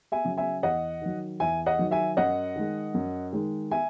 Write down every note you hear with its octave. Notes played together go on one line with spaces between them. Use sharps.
E5 G#5
C#3 F#3
E5 G#5
E2 D#5 F#5
D#3 F#3
E2 E5 G#5
D#5 F#5
D#3 F#3
E5 G#5
F#2 D#5 F#5
D#3 G#3
F#2
D#3 G#3
E5 G#5